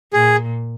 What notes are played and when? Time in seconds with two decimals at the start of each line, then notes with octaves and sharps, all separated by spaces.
0.13 A#2 G#4